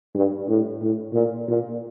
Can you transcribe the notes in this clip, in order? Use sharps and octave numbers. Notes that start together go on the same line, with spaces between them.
G2
A2
A2
A#2
A#2